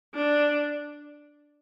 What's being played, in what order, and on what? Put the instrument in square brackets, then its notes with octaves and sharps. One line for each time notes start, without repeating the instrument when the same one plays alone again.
[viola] D4